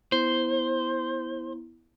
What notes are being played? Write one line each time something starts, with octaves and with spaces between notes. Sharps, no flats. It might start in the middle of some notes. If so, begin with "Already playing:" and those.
B3 E4 C5